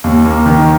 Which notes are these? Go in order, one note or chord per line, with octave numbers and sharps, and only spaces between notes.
D#2
A#3
D#3